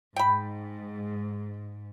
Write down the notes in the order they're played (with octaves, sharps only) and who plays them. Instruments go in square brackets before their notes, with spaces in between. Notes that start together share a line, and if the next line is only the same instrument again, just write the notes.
[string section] G#2 [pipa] G5 B5